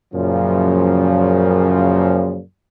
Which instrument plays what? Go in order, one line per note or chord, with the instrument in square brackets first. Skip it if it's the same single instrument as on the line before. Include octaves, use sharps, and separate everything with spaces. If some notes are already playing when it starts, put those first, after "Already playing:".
[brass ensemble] F#2 A#2 C#3 F3